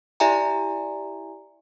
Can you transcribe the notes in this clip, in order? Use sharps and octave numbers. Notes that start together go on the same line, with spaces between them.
E4 G4 D5 E5 G#5 A#5